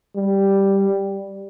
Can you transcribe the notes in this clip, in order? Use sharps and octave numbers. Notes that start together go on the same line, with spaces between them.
G3